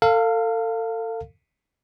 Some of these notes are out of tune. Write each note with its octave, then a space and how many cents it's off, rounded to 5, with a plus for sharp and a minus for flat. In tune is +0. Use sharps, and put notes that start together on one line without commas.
A4 +35 F5 +0